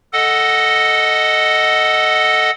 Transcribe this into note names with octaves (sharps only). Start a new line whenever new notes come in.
A4 D#5 F#5